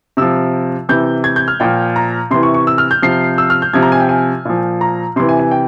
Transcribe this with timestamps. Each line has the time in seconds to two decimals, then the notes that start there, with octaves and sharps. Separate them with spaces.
0.17 C3 F3 E6
0.89 C3 E3 G6
1.24 G#6
1.36 G6
1.48 F6
1.60 A#2 F3 G5
1.96 A#5
2.31 C3 E3 C6
2.43 C#6
2.54 C#6
2.67 E6
2.78 F6
2.91 G6
3.02 C3 F3 C7
3.38 E6
3.50 F6
3.62 G6
3.73 C3 F3 G#6
3.82 A#5
3.92 G#5
4.00 G5
4.09 G#5
4.45 A#2 F3
4.81 A#5
5.16 C3 E3 C6
5.29 G#5
5.39 G#5
5.51 G5